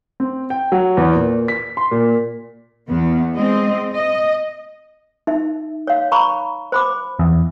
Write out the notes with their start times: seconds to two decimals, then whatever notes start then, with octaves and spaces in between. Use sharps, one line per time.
0.20 C4
0.50 G5
0.72 F#3
0.97 E2
1.15 A#2
1.48 B6
1.77 C6
1.91 A#2
2.89 E2 B3
3.35 G#3 C4 D#5
3.94 D#5
5.27 D#4 E5
5.87 C#5 F5
6.12 A#5 B5 C#6
6.72 C5 B5 D6
7.19 E2